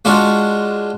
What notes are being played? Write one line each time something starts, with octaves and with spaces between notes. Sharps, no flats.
G#3 D4 F4 F#4